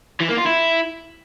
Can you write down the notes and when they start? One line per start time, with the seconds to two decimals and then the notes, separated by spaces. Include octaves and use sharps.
0.21 E3
0.29 A#3
0.38 F4
0.47 E4